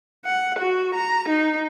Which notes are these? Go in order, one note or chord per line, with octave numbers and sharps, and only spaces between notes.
F#5
F#4
A#5
D#4